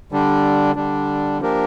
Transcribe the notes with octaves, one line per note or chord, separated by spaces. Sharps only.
D3 G3 D4
D3 G3 D4
F3 A#3 D4 G4 A#4